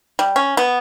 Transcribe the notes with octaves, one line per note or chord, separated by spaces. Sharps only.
G3
C#4
B3